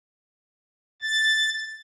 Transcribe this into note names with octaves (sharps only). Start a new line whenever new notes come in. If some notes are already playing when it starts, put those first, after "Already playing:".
A6